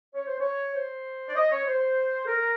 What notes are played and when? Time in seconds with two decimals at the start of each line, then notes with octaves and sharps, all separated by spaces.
0.14 C#5
0.27 C5
0.39 C#5
0.74 C5
1.29 D5
1.36 D#5
1.51 C#5
1.66 C5
2.23 A4
2.27 A#4